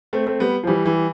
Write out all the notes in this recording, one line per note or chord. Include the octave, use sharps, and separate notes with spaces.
A3 C4
A3 C4
G3 B3
F3
E3 G3
E3 G3